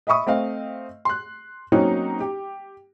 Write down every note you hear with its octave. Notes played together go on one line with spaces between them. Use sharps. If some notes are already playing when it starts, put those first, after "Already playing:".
D#5 E5 B5 C#6 D#6
A3 C4 D#5 F5
C6 F#6
F#3 A#3 C4 C#4 D#4 F#4
G4